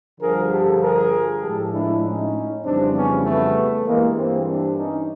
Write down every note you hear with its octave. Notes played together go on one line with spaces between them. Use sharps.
G2 D3 F3 G#4 A#4
G4 A4
G#4 A#4
A2 F3 G#3 G4 A4
D4 E4
C#4 D#4
F2 C#3 E3 G3 C4 D4
B3 C#4
A3 B3
G2 E3 G3 G#3 A#3
A#3 C4
C4 D4
C#4 D#4